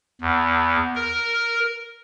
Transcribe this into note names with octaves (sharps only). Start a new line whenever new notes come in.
E2
A#4